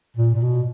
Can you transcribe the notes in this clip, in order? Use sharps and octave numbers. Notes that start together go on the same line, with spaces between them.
A#2
A#2
B2